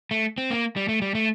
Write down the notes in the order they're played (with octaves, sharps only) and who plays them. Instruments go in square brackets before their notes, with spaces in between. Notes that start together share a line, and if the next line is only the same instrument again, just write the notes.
[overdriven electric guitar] A3
C4
A#3
G3
A3
G3
A3